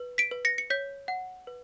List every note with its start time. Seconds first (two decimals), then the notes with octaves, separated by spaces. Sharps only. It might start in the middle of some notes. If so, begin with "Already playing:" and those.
Already playing: B4
0.18 B6 D7
0.31 B4
0.45 A#6 C#7
0.58 C#7
0.70 C#5 G6 B6
1.08 F#5
1.47 B4